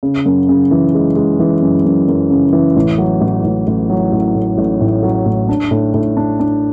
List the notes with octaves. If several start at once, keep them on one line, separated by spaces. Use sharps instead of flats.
C#3
F#2
C#3
E3
G#3
G#3
E3
F#2
F#2
F#2
C#3
E3
A1
F#3
A1
A1
A1
F#3
A1
A2
A1
A2
F#3
A2
D4
A2
A2
D4
D4